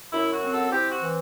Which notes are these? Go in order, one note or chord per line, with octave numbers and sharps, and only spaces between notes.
F#2 E4
F#4
C4
F#4 A4
C4 E4 G4
F#4
E3